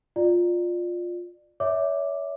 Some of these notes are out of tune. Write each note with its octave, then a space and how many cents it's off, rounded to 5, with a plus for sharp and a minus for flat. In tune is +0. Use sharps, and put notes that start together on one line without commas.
F4 +10 D5 +25
C#5 +30 E5 -20 D6 +5